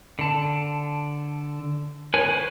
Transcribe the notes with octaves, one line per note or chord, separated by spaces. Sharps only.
D3 A5
B4 C#5 G#5
B4 C5